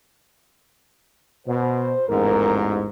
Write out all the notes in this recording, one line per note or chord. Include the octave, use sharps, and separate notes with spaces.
B2 C5
A1 E2 G#2 F3 C4 A#4